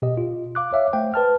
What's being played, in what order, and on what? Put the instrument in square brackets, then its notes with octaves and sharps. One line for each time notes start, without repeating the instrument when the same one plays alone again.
[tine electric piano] B2 G4 D#5
F4
F5 D6 F#6
C#5 E5 F5
A3 C5 G5
B4 A5 F6